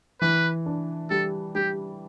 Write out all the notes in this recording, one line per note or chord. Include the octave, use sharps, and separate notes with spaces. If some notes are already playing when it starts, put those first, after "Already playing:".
E3 B4
D4
G3 A4
G3 G4